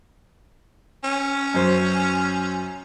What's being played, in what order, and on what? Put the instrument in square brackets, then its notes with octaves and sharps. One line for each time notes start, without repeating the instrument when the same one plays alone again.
[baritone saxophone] C#4
[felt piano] F#2 C5